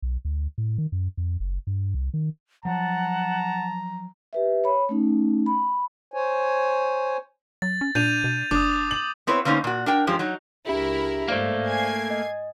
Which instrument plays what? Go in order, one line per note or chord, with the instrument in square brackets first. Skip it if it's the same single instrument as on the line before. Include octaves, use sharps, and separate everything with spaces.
[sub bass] B1
D2
A2
D#3
F#2
F2
F#1
G2
C2
D#3
[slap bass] F3 F#3 [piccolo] F#5 [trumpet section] A5 [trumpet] A#5
[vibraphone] G4 B4 E5
C#5 B5
A3 C#4 D#4
B5
[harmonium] C5 C#5 G#5
[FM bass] F#3 [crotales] A6
[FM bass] C#4
[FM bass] A#2 [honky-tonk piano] D4 [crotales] G6 D#7 F7
[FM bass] B2
[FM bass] F#1 [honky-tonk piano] D4 [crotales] D6 D#6
[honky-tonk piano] F#7
[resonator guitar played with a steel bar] B3 C4 E4 B4 C#5
D3 A#3 B3 C#4 D#4 C5
A#2 F#4
D4 A#4 G5
F#2 F3 G#3 G4
F#3 D#4
[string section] C#2 E4 A#4 [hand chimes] D4 G4 G#4
[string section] G#2 [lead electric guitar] A3 A#3 [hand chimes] C5 D5 F5
[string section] G#5 G#6 C7
[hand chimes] D#5